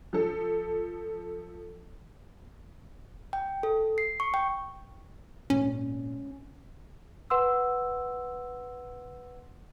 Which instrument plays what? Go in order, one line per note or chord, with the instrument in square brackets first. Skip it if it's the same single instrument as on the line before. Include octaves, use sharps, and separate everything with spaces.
[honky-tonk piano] F3 A4
[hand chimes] G5
A4
C7
C#6
G5
[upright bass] G#1 A#2 [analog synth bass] C#4
[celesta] B4 F#5 C6 E6